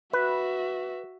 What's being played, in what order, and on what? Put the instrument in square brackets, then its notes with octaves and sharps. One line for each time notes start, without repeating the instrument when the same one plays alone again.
[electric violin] F#4 E5 [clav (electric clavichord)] B4